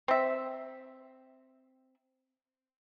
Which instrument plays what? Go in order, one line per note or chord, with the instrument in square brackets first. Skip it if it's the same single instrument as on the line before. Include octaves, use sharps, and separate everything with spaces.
[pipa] C4 E5